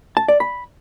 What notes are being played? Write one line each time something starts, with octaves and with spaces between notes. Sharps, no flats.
A5
D5
B5